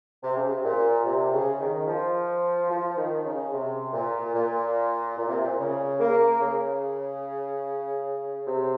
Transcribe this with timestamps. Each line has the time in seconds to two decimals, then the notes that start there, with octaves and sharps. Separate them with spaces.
0.23 C3
0.36 C#3
0.49 C3
0.64 A#2
1.05 C3
1.33 C#3
1.60 D#3
1.87 F3
2.70 F3
2.97 D#3
3.25 C#3
3.52 C3
3.93 A#2
4.35 A#2
5.17 A#2
5.28 C3
5.41 A#2
5.59 C#3
6.00 A#3
6.40 C#3
8.47 C3